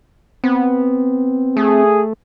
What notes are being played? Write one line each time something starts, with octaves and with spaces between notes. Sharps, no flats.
B3 C4
A3 G#4